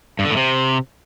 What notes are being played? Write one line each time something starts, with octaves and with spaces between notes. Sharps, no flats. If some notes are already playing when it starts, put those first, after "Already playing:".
G2
D3
A2
C3